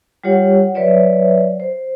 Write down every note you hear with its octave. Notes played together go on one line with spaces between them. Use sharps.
G3 F4 G4 C#5 F#5
F#3 B4 C#5 D5 E5
C5